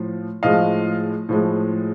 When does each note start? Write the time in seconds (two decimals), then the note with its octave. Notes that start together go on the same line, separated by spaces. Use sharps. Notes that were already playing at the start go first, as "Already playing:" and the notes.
Already playing: A2 F3
0.43 A2 F3 G#3 D#5 F5
1.29 A2 F3 G#3